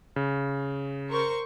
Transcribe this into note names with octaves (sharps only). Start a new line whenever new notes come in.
C#3
A#4 C5 C#6